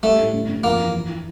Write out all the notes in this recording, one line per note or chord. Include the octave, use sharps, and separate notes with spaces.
G3 A3
A2
G2
G2
F2 A#3
E3
E4
E4